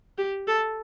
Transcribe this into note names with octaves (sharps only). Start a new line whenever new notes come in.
G4
A4